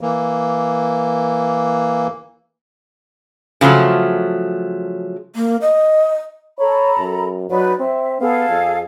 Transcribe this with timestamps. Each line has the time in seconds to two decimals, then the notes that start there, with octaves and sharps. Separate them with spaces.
0.01 E3 A#3
3.61 C#3 F3 F#3 A3
5.36 A#3
5.62 D#5
6.59 A4 C#5 A#5 B5
6.99 F#2
7.50 F#3 D#4 B4 D5
7.79 C4 E5
8.20 B3 G#4 A4 F5
8.49 F2